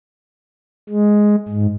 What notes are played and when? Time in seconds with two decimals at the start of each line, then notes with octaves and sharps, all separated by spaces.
0.89 G#3
1.48 G#2